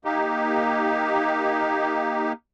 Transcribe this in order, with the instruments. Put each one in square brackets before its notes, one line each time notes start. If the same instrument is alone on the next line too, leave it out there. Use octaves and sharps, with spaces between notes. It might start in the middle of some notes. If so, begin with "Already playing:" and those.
[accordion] A#3 D#4 G4